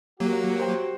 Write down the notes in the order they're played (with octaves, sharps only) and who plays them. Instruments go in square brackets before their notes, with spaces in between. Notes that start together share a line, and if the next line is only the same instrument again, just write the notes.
[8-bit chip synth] F#3 A#3 [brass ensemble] F#4 [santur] G4
[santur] C5 G5